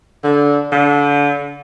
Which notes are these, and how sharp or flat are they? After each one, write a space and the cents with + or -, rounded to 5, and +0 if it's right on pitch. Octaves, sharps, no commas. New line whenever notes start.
D3 -20
D3 -30